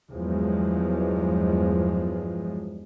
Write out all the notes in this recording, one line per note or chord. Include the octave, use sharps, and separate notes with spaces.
E2 G2 F3 F#3 G#3